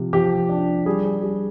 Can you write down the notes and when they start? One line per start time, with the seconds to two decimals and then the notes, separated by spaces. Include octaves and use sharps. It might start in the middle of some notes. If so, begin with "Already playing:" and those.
Already playing: C3 F3
0.13 F3 G4
0.49 D4
0.86 G3 G#4
1.05 G#4
1.23 G3 G#4